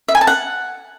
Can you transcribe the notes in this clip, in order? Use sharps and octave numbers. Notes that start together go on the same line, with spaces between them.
E5
G#5
A5
F#5